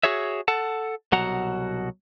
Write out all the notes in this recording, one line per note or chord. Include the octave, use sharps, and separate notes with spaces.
F#4 G#4 C#5 E5
A4 F#5 A5
C2 B2 F#3 F#4 F#5 A#5